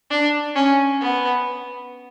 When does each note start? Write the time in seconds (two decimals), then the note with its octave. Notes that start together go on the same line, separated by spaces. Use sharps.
0.11 D4
0.55 C#4
1.01 B3